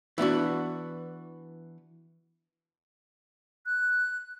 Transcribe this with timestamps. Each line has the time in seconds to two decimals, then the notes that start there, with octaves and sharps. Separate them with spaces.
0.18 E3 B3 D4 F#4
3.66 F#6